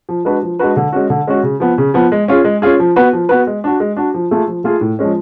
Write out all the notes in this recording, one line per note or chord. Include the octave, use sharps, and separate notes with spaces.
F3
G#3 D4 F#4 B4
F3
G#3 D4 F#4 B4
D3
G#3 C#4 F#4
D3
G#3 C#4 F#4
C#3
F3 B3
C#3
F3 B3
G#3
C#4 F4 G#4
G#3
C#4 F4 G#4
F3
B3 F#4 B4
F3
B3 F#4 B4
G#3
D4 F#4
G#3
D4 F#4
F3
A3 F4 G#4
F3
A3 F4 G#4
A2
F3 G#3 C#4